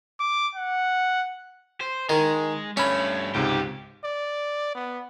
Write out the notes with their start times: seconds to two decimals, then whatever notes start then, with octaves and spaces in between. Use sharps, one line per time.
0.20 D6
0.55 F#5
1.81 C5
2.09 D#3 G#3
2.77 G2 A3 C#4 C#5 B5
3.34 C#2 G#2 C3 G4
4.04 D5
4.75 B3